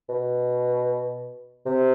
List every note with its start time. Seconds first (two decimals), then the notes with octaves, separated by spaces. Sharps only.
0.09 B2
1.66 C3